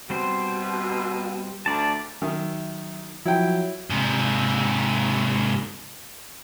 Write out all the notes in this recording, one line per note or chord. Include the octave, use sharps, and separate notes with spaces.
B2 G3 C4 C5
D2 D5 A5
D#3 F#3 E5
F3 F#3 E4 G5
G#2 C3